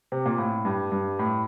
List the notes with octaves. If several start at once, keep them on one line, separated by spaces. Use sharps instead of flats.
C3
A#2
A2
G2
G2
A2